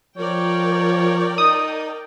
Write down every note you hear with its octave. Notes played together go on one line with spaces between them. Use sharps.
F3 A#4 C#5 D5 G5
D#4 D#6